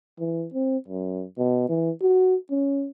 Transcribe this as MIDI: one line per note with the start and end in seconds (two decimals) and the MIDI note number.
0.20 0.47 52
0.54 0.77 60
0.88 1.24 42
1.38 1.66 47
1.69 1.91 52
2.02 2.36 66
2.51 2.89 61